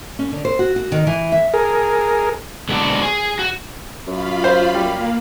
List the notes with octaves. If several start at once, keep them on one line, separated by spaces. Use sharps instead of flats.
C#4
D3
C5
F#4
F#4
D#3
E3
E5
G#4 A#4
D3 G#3 B3 F#4 A4 D5
G#4
F#4
F#2 F4 F5 B5
C5
G3 A#3